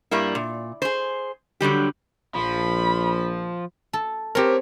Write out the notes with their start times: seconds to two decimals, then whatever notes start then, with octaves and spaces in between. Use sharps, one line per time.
0.11 G2 G3 A#3 E4
0.35 A#2
0.82 G#4 C5
1.61 D3 F#3 G3 G4
2.35 A#1 F3 B5
3.93 A4
4.35 C4 G4 A#4 C#5